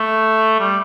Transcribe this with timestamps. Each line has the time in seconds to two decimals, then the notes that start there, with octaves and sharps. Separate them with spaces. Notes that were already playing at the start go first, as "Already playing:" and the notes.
Already playing: A3
0.60 G3